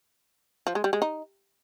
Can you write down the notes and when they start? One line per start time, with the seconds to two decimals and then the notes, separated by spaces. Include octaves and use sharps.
0.67 F3
0.75 G#3
0.84 G3
0.93 G#3
1.02 D#4